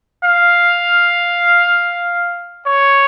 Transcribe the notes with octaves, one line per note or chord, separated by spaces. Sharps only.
F5
C#5